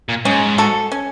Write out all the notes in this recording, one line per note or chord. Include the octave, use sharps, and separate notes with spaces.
A#2
G#2 C#4
F#4 A4
C#4